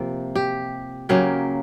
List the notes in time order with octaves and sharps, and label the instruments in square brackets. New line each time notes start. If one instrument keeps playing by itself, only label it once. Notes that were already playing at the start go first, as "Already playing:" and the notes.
Already playing: [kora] C3 F3 A#3
G4
C#3 F#3 A#3 G4